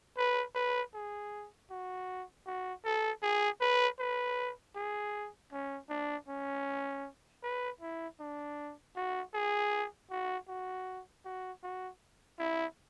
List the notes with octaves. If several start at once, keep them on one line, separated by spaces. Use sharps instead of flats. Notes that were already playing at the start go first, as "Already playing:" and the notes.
B4
B4
G#4
F#4
F#4
A4
G#4
B4
B4
G#4
C#4
D4
C#4
B4
E4
D4
F#4
G#4
F#4
F#4
F#4
F#4
E4